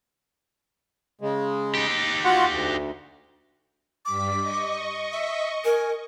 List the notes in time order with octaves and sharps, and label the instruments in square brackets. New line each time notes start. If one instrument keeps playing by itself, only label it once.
[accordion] C#3 G#3
[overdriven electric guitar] D#4 G4
[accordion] F4 F#4 F#5
D2
[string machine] G2 G3 B6 [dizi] D6
[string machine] D#5 C#6
[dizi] E5
[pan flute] A#4 [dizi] G#5